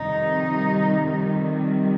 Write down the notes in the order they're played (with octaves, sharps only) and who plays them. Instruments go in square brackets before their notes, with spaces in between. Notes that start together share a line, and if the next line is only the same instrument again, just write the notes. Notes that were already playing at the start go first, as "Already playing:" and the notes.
Already playing: [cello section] F2 C3 D#3 G3 D#4